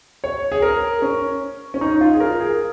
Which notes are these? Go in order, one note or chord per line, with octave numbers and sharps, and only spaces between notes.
C#5
G#4
A#4
C#4
C#4
D#4
F4
G#4
A#4
G#4